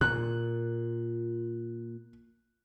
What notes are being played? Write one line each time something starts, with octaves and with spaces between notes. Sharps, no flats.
A#2 F#6